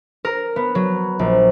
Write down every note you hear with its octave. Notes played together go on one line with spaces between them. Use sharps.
A#4
B3
F#3
A#1